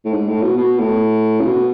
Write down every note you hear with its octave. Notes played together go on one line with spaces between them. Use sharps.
A2
G#2
A2
B2
B2
A2
C#3
B2